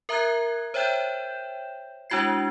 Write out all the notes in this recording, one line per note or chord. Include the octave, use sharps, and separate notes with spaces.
A#4 E5 A#5 D#6 F#6 G#6
C5 C#5 E5 G5 G6 E7
G#3 D4 E4 F#4 G#6 C7